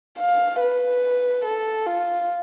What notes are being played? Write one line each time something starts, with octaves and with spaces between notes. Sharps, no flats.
F5
B4
A4
F4